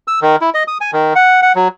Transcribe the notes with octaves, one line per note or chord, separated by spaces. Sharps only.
E6
D#3
E4
D#5
D#6
G#5
D#3
F#5
F#5
F#3